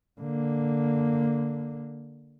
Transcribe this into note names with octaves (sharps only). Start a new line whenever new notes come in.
D3 A#3